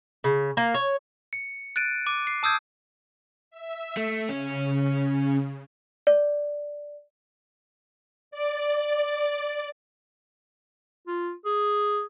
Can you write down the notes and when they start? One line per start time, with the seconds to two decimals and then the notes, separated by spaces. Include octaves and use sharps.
0.24 C#3
0.57 A#3
0.74 C#5
1.33 C#7
1.76 F#6 A6 D7 D#7
2.07 D6 D#7
2.27 C7
2.43 A5 D#6 E6 G6 G#6
3.51 E5
3.97 A3
4.29 C#3 C#4
6.07 D5
8.31 D5
11.08 F4
11.45 G#4